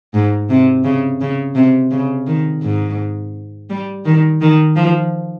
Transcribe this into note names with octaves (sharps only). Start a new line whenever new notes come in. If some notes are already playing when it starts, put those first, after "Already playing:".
G#2
C3
C#3
C#3
C3
C#3
D#3
G#2
G3
D#3
D#3
F3